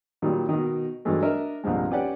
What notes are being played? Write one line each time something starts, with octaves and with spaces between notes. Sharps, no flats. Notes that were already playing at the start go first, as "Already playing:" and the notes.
A#2 D#3 F#3 G3
B2 D#3
G2 E3 F#3 G#3 A3
D4 A#4 D#5 E5
C2 G2 A#2 F3 G#3
C#4 G4 B4 D5 F#5